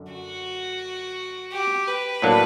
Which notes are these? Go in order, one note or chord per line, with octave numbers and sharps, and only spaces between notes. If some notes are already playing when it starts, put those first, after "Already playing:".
Already playing: F#2 D3
F#4
G4
B4
A2 F#3 A#3 D4